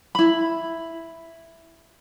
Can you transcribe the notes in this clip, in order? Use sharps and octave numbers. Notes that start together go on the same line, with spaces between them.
E4 B5